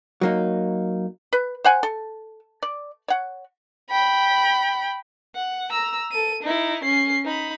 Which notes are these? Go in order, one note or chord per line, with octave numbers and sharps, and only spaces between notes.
F#3 A#3 D#4
B4
C5 F#5 G#5
A4
D5
C#5 F#5
G5 B5
F#5
A#5 E6
A4 D#7
D#4 E4
C#4 C7
D#4 B5